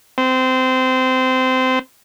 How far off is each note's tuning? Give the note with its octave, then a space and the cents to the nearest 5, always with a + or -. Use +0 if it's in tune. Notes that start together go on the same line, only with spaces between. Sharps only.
C4 -20